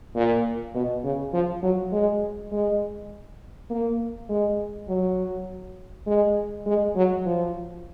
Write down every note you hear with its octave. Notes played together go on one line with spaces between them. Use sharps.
A#2
B2
C#3
F3
F#3
G#3
G#3
A#3
G#3
F#3
G#3
G#3
F#3
F3